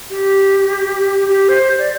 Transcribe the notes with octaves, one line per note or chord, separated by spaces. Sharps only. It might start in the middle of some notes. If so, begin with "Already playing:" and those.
G4
G4
C5
D5